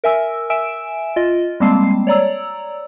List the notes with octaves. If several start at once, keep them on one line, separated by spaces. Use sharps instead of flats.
A#4 E5 G#5 E6
E5 G#5 E6 D7 E7
F4 D#5
G3 G#3 A#3 C4 A5 C7
C#5 D5 A#5 E6